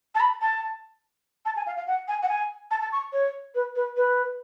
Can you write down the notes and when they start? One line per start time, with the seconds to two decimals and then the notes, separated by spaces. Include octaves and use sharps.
0.15 A5
0.20 B5
0.41 A5
1.45 A5
1.56 G#5
1.66 F5
1.77 F5
1.87 F#5
2.08 G#5
2.22 F#5
2.29 G#5
2.71 A5
2.81 A5
2.92 C#6
3.12 C#5
3.55 B4
3.76 B4
3.97 B4